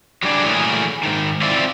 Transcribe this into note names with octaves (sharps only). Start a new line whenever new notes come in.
F#3 G3 D4 G#4 D5
A#2 E3 F#3 A3 G#4 A#4
G#2 D#3
C4 E4 F4 D5